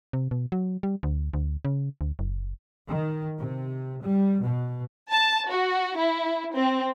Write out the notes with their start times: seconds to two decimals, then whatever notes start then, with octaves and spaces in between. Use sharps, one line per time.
0.13 C3
0.31 B2
0.52 F#3
0.83 G3
1.03 D2
1.34 D2
1.65 C#3
2.01 D2
2.19 F#1
2.89 D#3
3.40 C3
4.01 G3
4.43 B2
5.14 A5
5.51 F#4
5.99 E4
6.56 C4